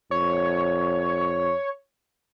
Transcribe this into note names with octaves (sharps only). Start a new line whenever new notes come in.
F2 C#5